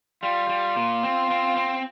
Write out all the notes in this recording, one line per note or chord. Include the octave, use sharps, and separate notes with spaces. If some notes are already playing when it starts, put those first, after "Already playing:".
G3 F4
G3
A#2
C4
C4
C4